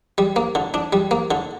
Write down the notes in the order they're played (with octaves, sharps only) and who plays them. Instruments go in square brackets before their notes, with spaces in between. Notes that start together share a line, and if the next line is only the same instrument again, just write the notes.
[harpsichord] G3
A#3
D3
D4
G3
A#3
D3